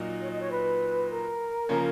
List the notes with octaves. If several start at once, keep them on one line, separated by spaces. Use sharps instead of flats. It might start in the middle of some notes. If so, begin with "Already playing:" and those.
Already playing: A#2 F#3 A#3 D#4
C#5
D#5
C#5
B4
A#4
C#3 F3 A#3 C#4